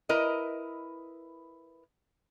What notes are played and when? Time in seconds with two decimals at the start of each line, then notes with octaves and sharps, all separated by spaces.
0.09 E4 A#4 B4 D#5